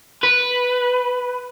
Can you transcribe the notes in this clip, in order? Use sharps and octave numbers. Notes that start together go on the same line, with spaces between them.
B4